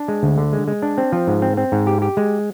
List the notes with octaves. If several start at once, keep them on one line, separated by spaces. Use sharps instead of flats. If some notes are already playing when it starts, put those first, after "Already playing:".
Already playing: D4
G#3
D2
D3
G#3
G#3
D4
C4
F3
G#2
C4
C4
G#2
G4
G4
G#3